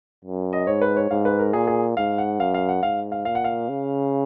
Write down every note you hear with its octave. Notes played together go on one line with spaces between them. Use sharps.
F#2
D#5
G#2 C#5
B4
C#5
G#2 F5
B4
A#4
A#2 G#4
G#4
G#2 F5
F#5
F#2 F5
F5
F#5
G#2 F5
F5
A#2 F5
F#5
F5
C#3